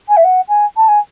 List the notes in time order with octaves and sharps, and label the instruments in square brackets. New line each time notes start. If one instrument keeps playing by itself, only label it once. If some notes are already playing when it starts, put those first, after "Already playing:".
[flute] G#5
E5
F#5
G#5
A5
G#5